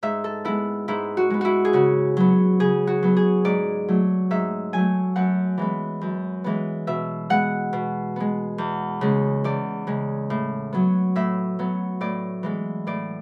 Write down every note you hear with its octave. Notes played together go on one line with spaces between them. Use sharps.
G#2 E5
A4
G#3 B3 E4
G#2 E4
F#4
G#3 B3
E4 F#4
G#4
C#3 F#4
F#3 B3
C#3 G#4
F#4
F#3 B3
G#4
G#2 D5
F#3 A3
G#2 E5
F#3 A3 G#5
F#2 F#5
E3 G#3 B3
F#2
E3 G#3 B3
B2 E5
G#3 B3 F#5
B2
G#3 B3
E2
C#3 G#3
E2 D5
C#3 G#3
A2
F#3 B3
A2 E5
F#3 B3
A2 D5
E3 G#3 B3
A2 D5